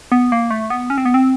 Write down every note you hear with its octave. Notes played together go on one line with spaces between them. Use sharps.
B3
A#3
A3
B3
C#4
C4
B3
C4